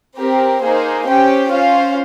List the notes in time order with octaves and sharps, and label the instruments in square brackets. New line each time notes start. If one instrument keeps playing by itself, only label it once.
[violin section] C4 G4 A#4
A#3 D#4 G#4 C5
C#4 G4 C5 G5
C#4 F4 C5 F5